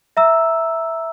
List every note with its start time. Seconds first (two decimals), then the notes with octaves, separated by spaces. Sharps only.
0.17 E5 A#5 E6